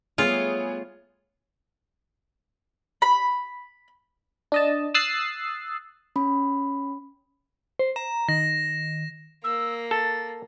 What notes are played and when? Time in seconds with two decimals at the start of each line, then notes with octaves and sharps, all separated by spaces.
0.18 G3 A3 B3 F4 G#4 C#5
3.02 B5
4.52 D4 D#5 A5
4.94 D#6 E6 F#6 A6 C7
6.16 C#4 B5
7.79 C5
7.96 A#5 E7
8.29 D#3 A#6
9.44 A#3 E6
9.91 A4 A6